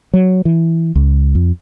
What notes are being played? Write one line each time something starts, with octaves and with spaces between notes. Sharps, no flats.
F#3
E3
C#2
F2